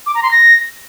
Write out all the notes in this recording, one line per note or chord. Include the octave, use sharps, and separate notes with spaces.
D6
A#5
C6
A#6